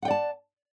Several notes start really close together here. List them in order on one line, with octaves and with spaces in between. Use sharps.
F#5 G5 D5 A5